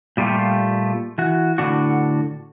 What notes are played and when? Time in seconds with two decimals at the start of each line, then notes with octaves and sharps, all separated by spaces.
0.17 A#2 G3 A3 F4 G4
1.18 E3 F#4
1.58 A2 D3 D4 F#4